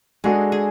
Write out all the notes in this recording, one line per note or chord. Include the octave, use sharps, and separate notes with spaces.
G#3 D4 F#4 G#4 A4
G#4